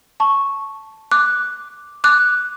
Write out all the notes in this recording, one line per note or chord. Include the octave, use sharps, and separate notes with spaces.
A5 C#6
D6 F#6
D6 F#6